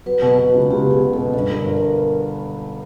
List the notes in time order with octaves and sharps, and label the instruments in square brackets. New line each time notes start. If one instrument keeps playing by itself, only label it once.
[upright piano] F#3 [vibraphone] B4
[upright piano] B2 [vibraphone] B4
[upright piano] B2
[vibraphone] F#4
[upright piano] C#2
[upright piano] C#2 [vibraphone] G4
[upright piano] B2 [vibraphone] G#4
[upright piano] B2
[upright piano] B2 [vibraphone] A4
[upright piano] G2 [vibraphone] A4
[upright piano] G1
[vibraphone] A#4
[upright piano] G1
[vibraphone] A#4